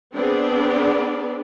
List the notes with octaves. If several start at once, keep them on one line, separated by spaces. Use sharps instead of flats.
B3 C4 D4 G#4 B4 D5